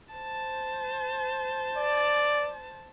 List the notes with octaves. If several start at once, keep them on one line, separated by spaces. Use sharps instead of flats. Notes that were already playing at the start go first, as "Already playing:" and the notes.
C5 A5
D5